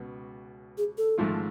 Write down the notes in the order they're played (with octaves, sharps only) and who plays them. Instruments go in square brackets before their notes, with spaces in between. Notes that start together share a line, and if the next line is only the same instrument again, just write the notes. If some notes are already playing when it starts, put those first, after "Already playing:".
Already playing: [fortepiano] C#2 B2 B3
[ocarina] G#4
A4
[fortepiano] G#1 G#2 F3 A3 F4